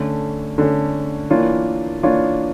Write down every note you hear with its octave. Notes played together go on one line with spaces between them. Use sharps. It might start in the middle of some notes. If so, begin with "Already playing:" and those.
Already playing: D3 A3 C#4
D3 A3 C#4
E3 A#3 D4 F4 C#5
E3 A#3 D4 F4 C#5